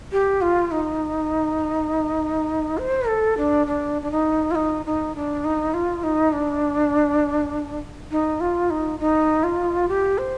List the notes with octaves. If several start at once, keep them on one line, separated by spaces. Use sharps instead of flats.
G4
F4
D#4
C5
A4
D4
D4
D4
D#4
F4
D#4
D#4
D4
D#4
F4
D#4
D4
D#4
F4
D#4
D#4
F4
G4
C5